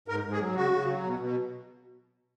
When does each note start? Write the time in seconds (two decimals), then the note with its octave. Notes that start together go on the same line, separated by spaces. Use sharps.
0.08 G#2 A#4
0.24 G#2
0.32 G#4
0.39 F#3
0.56 C#3 F#4
0.72 C#3
0.87 F#3
1.03 B2
1.19 B2